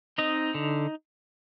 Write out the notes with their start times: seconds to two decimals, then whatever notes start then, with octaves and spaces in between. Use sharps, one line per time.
0.18 C4 D#4 D#5
0.54 D3